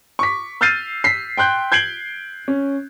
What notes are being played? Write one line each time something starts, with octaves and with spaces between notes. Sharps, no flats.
C#6 D6 B6
E6 F6 G6 A6 C7 D#7
B6 C7
G5 C6 F#6 G6
G6 G#6 C7 D7 F#7 G7
C#4